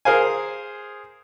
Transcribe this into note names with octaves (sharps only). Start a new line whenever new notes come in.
G#4 A#4 C5 F5 G#5